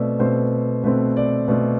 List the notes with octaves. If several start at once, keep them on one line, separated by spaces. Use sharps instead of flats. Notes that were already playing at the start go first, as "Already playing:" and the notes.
Already playing: B2 A3 C4 D5 E5
B2 A3 C4 C5
B2 A3 C4 B4
D5
B2 A3 C4 D5